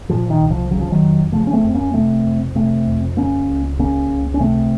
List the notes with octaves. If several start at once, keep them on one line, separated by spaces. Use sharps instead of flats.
A#2 F3
D#3
C2
F3
C#3 F#3
F3
D#3 F#3
F2
C#3 F3 A3
C#4
A3 C4
F2
A#3 C#4
C3 A3 C4
F2
C3 A3 C4
F2
C#3 A#3 C#4
C#2
C#3 A#3 C#4
C#2
C#4
C3 A3 C4